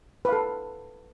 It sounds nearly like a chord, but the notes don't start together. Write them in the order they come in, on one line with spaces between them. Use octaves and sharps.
B4 F5 A4